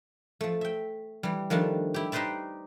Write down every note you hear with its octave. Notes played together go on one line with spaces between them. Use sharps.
F3 A3
E5 G5
E3 G3
D#3 F3 G3 A3 D4
E4 G4
D#4 G4 B4 C5 D5 E5